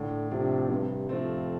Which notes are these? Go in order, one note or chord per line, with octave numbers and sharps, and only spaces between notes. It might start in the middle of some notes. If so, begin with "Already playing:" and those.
Already playing: A2 D3
C3 F3 D4
G2 C3
F2 F3 A3 C4